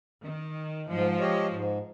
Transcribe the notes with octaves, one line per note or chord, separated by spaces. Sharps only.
D#3
G#2 F3 G#3
G4 C#5 D#5
G#2